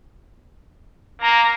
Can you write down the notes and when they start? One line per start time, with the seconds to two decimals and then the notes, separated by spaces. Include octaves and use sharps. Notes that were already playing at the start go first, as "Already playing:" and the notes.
1.22 A#3 A#5